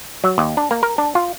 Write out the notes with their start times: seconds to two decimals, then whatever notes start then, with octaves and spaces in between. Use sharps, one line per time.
0.24 F#3
0.38 D#2
0.57 D4
0.71 A#3
0.83 A#4
0.98 D4
1.15 F4